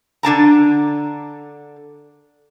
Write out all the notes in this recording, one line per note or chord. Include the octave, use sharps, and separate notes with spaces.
D3 D4 A5 A#5